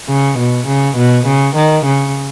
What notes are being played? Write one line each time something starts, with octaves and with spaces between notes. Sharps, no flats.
C#3
B2
C#3
B2
C#3
D#3
C#3